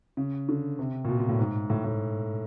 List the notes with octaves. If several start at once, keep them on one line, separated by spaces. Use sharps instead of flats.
C#3
D3
C3
A#2
B2
A#2
A2
G#2
A2
A2